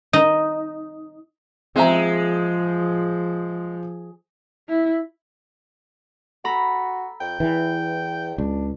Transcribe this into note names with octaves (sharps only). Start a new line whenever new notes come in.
D#4
F3 G#3 C4 E5 A#5
E4
F#4 A4 A#5 B5
F2 G5
E2 E3
C#2 D4